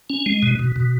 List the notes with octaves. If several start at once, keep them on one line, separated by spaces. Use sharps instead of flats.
C#4
G#3
B2
B2
B2